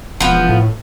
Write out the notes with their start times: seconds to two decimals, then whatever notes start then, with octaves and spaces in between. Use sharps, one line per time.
0.20 E1 F3 B3
0.49 A2